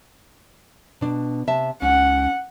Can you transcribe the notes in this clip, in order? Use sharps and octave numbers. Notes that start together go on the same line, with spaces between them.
B2 D4
C3 E5 A5
C#2 C#4 F#5